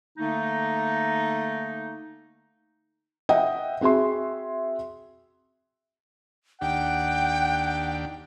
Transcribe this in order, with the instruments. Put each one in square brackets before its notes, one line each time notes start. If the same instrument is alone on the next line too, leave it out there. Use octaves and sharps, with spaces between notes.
[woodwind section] D3 A3 A#3 D#4
[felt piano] D#5 E5 F#5 G5
C4 F#4 G#4 E5 C6
[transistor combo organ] D#2 D4 G4 [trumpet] F#5 [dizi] G5